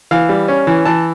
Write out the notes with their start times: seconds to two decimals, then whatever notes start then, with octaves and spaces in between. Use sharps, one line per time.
0.11 E3 F5
0.29 G3
0.48 C#4
0.67 E3
0.85 E3 A5